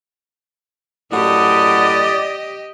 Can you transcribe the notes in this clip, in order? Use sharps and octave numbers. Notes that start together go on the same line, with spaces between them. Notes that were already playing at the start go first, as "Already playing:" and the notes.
F#2 A2 G4 D5 D#5 F#5 D#6